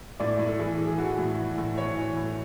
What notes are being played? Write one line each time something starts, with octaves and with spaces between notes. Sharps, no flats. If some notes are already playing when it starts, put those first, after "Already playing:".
A2 D5
A2
A4
E3 G#4
E3
G#4
E3 F#4
A2
E3
A2
E3 C#5
E3
A2